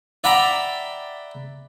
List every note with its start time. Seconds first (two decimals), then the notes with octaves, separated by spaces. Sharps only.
0.24 D5 E5 F#5 G5 A#5 B5